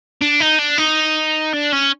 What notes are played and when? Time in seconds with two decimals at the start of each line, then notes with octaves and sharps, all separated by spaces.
0.22 D4
0.41 D#4
0.59 D4
0.78 D#4
1.53 D4
1.73 C#4